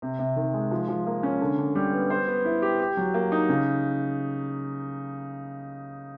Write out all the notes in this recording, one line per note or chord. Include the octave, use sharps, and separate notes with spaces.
C3
C3
D#3
G#3
F3
F3
A#3
C#4
D3
D3
G3
B3
C5
B3
E4
G4
G4
F#3
A#3
D#4
C#3